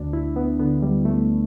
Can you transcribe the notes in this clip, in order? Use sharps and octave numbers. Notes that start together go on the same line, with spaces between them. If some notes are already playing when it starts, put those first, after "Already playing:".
Already playing: D2 D4
E4
D2
B3
D3 B3
G3
D3
A3